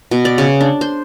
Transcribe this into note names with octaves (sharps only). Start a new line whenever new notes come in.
B2
D5
C#3
D4
C5